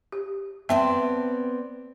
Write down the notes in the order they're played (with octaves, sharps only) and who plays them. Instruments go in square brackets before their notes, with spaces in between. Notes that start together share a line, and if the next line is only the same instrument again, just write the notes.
[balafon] G4
[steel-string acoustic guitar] B3 C4 D5 [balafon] E5 G5 A5